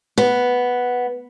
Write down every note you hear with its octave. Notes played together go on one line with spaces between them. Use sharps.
B3